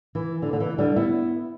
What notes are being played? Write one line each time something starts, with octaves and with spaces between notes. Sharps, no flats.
E3
D3
D3
E3
D3 G3
B3 E4